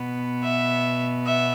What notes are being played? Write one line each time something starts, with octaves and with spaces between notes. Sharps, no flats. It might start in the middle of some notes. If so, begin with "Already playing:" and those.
Already playing: B2 B3
E5
E5